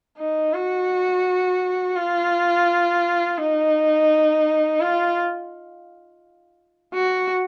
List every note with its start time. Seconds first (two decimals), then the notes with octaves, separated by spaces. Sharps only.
0.18 D#4
0.53 F#4
1.96 F4
3.38 D#4
4.80 F4
6.94 F#4